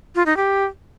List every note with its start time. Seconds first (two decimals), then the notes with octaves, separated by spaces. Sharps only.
0.15 F4
0.26 D#4
0.37 G4